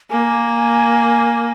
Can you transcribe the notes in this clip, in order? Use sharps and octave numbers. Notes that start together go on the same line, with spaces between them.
A#3 G#5